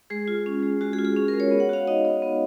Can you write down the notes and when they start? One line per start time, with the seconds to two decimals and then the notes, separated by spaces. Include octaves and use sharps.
0.10 G#3 G#4
0.28 F4
0.46 C#4
0.63 G#3
0.81 G#3 F#4
0.93 G#4
0.98 F4
1.05 G#4
1.16 C#4
1.28 A#4
1.33 G#3
1.40 C#5
1.51 B3
1.60 F#5
1.69 F#4 F5
1.87 D#4 D#5
2.05 B3
2.22 B3